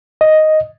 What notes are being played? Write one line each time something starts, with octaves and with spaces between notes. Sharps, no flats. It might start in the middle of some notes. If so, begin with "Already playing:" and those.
D#5